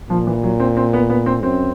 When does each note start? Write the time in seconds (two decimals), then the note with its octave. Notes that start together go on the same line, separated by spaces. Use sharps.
0.10 A#2 F3
0.27 E3
0.44 F#3
0.60 C4
0.77 C4
0.93 B3
1.10 B3
1.26 C4
1.43 F#2 C4